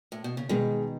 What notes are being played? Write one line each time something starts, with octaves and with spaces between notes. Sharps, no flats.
A2
B2
C#3
B2 D#3 G#3